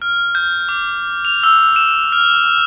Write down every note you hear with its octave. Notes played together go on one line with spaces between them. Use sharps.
F6
G6
D6
F7
E6
E7
F6